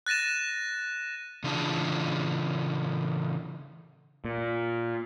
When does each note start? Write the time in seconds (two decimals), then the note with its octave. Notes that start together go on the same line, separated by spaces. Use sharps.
0.07 F#6 A6 A#6 D#7 E7
1.44 C#3 E3 D4 F4 G#4 A5
4.25 A#2